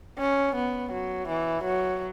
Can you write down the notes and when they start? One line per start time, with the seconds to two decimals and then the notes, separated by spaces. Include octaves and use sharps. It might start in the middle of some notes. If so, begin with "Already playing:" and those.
0.18 C#4
0.55 B3
0.92 F#3
1.28 E3
1.64 F#3